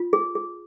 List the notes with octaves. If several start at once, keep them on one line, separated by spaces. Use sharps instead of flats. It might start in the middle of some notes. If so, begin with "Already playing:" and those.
Already playing: F4
G#4
G#4